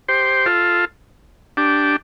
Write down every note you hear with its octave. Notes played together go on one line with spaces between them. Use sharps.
G4 C5
F4 A4
D4 G4